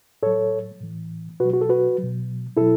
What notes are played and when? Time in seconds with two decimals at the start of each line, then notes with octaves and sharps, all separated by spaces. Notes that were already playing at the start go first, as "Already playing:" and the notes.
0.22 A2 F#3 A4 C#5
0.81 A2 E3
1.40 B2 F#4 B4
1.45 F#3
1.53 F#4
1.61 A4
1.69 F#4 B4
1.98 B2 F#3
2.57 B2 F#3 E4 A4